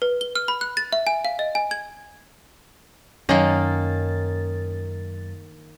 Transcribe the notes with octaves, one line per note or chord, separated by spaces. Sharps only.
B4
G7
F6
B5
F#6
A6
E5
G#5
F5
D#5
G#5
G#6
F#2 D#3 A#3 C#4 C#5 G#5 A6